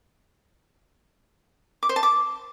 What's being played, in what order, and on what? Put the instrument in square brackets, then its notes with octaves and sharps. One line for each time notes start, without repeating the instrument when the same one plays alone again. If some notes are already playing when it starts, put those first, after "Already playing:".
[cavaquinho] D6
C5
A5
D6